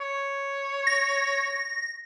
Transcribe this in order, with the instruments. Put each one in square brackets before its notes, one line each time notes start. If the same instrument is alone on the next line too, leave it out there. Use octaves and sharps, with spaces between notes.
[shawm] C#5
[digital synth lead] A#6